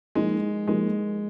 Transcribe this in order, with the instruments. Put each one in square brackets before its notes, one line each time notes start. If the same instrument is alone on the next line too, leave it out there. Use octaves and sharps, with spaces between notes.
[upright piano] F3 A#3 D#4 [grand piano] G#3
[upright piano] F3 A#3 D#4 [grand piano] G#3